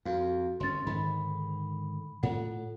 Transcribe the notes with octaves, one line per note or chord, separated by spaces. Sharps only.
F2 F#4 F5
G1 C#4 C6 A6
G#2 D3 D#3 B5
A2 F4 A4 F#5